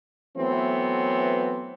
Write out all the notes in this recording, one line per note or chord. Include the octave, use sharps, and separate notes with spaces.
E3 F#3 A3 B3 C4